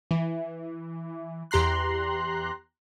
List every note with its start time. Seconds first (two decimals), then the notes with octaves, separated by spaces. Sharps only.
0.11 E3
1.51 E2 G4 A#5 C6 F#6